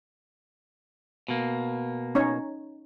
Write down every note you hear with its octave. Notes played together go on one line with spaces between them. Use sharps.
B2 A#3
C#4 D#4 C#5